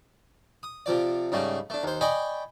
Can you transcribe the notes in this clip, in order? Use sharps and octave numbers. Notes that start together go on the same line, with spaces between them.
D#6
C3 F3 D5
G#2 C#3 G3 A3
A3 D4
D#2 C5
D5 D#5 G5 G#5 B5 C#6